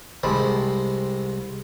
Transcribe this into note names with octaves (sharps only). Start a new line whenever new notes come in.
C2 G#3 C4 A5 B5